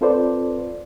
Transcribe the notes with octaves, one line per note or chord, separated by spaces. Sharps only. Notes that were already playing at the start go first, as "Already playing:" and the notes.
C4 F4 A4 B4 C5 D5